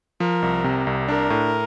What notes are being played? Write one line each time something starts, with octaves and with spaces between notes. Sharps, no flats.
F3 A#4
C2
C3
C2
D4 A#4
A2